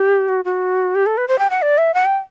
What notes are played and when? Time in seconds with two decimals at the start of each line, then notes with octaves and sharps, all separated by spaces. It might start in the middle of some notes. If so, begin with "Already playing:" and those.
Already playing: G4
0.28 F#4
0.45 F#4
0.95 G4
1.06 A4
1.17 B4
1.28 C5
1.39 G5
1.50 F#5
1.62 D5
1.78 E5
1.94 F#5
2.05 G5